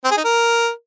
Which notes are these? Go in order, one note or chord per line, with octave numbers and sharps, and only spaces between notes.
C4
G#4
D#4
A#4